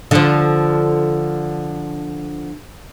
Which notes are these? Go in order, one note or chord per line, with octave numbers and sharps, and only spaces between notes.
D3 F3